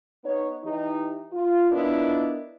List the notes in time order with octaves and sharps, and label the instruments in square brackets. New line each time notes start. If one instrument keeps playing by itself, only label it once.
[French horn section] B3 D#4 C#5
E3 D#4 G4
F4
B3 D4 E4 F4 A#4 D#5